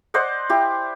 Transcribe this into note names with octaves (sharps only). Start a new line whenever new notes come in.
C5 D5 D#5 F#5
E4 G4